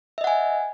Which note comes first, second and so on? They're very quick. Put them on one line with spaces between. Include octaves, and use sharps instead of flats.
E5 D#5 F#5 G#5